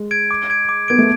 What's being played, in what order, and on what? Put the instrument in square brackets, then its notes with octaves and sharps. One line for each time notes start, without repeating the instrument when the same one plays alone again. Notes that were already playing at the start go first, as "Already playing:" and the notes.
Already playing: [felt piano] G#3
[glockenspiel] G#6 D7
D6
G#6 D7
D6
[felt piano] B3 [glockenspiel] G#6 D7
[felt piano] A3